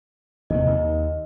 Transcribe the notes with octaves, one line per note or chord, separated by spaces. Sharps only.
D#2 C3 D#3 D#5
D#2 D#3